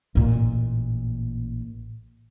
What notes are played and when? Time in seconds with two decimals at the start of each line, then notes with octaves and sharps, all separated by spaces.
0.15 A1 A#2